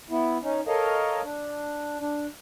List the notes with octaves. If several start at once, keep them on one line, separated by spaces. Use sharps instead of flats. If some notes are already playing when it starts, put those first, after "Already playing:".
B3 E4
C#4 D#4
A4 A#4 C#5 D#5 F5
D4
D4